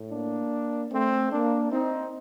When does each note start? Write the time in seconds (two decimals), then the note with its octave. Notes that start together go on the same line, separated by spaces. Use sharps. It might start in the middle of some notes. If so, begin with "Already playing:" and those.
Already playing: A2
0.10 A#3 D4
0.92 A3 C4
1.32 A#3 D4
1.71 C4 D#4